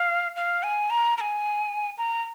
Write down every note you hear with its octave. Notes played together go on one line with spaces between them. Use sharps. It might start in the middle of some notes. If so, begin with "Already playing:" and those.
Already playing: F5
F5
G#5
A#5
A#5
G#5
A#5